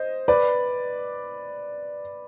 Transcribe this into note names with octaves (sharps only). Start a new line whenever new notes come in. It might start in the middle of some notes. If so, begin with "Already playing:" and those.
Already playing: C5 D#5
B4 D5